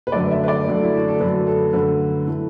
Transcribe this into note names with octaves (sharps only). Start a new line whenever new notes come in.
B4
F#2 D3 F#3 A3 D5
E5
B4
D5
F#2 D3 F#3 A3
E4
F#4
A4
F#2 D3 F#3 A3 B4
A4
F#2 D3 F#3 A3 B4
A2 E3 A3